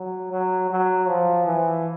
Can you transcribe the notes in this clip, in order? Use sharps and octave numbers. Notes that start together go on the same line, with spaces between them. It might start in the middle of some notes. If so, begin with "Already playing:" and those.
Already playing: F#3
F#3
F#3
F3
E3